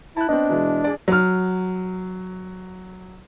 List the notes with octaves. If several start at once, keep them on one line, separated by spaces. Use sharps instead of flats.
E4 A5 F#6
B3 C4 D4 D#5
B2 E3 G#3
G#4 D5
F#3 F6